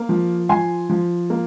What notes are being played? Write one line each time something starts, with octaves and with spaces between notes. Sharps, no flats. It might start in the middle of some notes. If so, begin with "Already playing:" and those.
Already playing: A#3
F3
F3 G#5 C6
F3
A#3